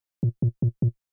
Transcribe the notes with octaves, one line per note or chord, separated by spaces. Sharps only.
A#2
A#2
A#2
A#2